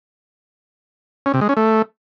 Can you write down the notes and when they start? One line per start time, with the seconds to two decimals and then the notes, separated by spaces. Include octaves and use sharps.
1.26 C#4
1.34 C3
1.41 G#3
1.49 C#4
1.57 A3